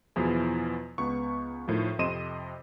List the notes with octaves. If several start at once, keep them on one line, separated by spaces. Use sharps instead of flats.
E2 B2 F3 E4 G#4
C#2 B3 C#6
A2 D#3 F3
F2 C3 D#5 C6 D#7 E7